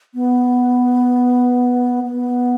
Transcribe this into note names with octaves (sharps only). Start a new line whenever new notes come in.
B3
B3